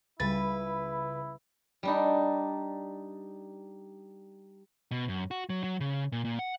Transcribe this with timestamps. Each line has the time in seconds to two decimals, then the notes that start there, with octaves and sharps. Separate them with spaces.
0.20 C#2 C#3 G3 E4 B4 A6
1.83 G3 D4 D#4
4.91 B2
5.08 F#2
5.31 F#4
5.49 F#3
5.64 F#3
5.80 C#3
6.12 A#2
6.25 A#2
6.39 F#5